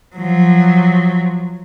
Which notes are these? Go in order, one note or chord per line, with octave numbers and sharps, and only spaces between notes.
F3 F#3